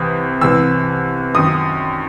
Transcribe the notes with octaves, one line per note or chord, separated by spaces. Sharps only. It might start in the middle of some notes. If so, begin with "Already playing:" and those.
Already playing: C2 C3 E3 D#6
C2 C3 E3 E6
F#2 D#3 D#6